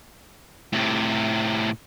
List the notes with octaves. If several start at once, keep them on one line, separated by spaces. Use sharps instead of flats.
A2 C3